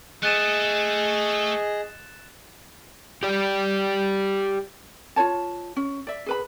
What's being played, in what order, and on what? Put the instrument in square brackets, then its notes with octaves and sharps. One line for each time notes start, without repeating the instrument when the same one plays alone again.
[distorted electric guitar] A3 [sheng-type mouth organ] G#4 D#5 [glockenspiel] F#6 A6 E7
[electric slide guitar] G4 D5
[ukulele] F4 C5 C#5 A5
C#4
D5 E5
G#4 B4 B5